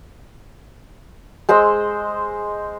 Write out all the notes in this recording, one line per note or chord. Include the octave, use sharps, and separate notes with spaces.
G#3 C5 D#5 E6